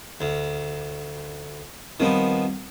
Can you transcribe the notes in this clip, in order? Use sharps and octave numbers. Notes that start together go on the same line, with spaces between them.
D2
D#3 F3 G3 B3 C4 A#4